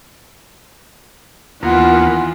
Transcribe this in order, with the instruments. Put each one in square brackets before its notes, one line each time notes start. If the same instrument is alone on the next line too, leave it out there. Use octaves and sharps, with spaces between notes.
[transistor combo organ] D#2 A#3 B3 [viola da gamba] E3 F4 [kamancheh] F#5